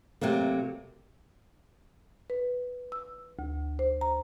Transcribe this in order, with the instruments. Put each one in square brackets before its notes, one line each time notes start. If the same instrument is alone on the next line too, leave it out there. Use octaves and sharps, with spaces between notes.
[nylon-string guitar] C3 F#3 A3 A#3
[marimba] B4
E6
D2
C5
A#5